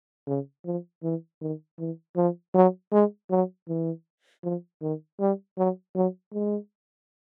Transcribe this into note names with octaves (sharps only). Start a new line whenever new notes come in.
C#3
F3
E3
D#3
E3
F3
F#3
G#3
F#3
E3
F3
D#3
G3
F#3
F#3
G#3